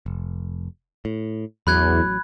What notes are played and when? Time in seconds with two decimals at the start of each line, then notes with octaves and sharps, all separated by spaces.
0.06 F1
1.05 A2
1.67 A1 E2 F#3 B5 F#6 G#6